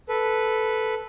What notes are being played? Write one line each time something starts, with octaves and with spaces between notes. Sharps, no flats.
A4 B4